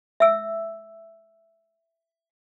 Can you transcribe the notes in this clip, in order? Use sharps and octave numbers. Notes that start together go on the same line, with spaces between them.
E5 E6